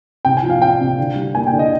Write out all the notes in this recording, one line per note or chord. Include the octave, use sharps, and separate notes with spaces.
C3 G5
G#5
F3
F5
C4 G5
C3
D3
G3
A#3 G#5
G5
D3
D#5